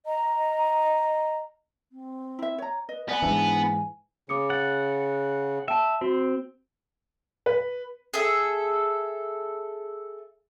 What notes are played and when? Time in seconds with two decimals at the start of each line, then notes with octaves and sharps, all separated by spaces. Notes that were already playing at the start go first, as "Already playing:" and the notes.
0.05 D#5 A#5
1.92 C4
2.39 E4 E5
2.58 C#5 A#5
2.89 B4 D#5
3.09 B3 D5 F#5 G#5 B5
3.22 G#2 E3 D4 E4
4.29 C#3 D6 D#6 C#7
4.50 F#5 A6
5.68 E5 G5 A5
6.01 C4 F#4
7.46 B4
8.14 G#4 A4 E5